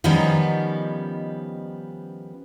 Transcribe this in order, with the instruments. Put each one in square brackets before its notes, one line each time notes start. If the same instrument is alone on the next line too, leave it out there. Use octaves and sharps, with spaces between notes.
[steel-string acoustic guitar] D#3 F3 G3 B3 C#4 D#4